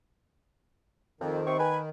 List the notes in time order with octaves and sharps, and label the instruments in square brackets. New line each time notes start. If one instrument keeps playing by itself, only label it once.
[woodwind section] F2 [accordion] D#3
[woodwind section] C3 C4 C#6
B4 G#5